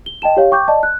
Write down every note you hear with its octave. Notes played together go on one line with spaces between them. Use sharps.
G7
D#5 G5 A5 E7
G4 C#5 F5
G5 C#6 D6 G6
D5 D#5 A5
F#6